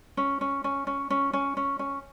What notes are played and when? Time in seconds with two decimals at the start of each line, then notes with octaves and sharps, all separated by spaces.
0.17 C#4
0.41 C#4
0.64 C#4
0.87 C#4
1.10 C#4
1.33 C#4
1.57 C#4
1.79 C#4